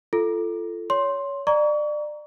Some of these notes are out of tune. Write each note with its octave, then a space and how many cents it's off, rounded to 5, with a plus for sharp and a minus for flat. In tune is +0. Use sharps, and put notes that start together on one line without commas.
F4 -25 A4 -5
C#5 +20 C6 +10
D5 +25 A#5 +0 C#6 +40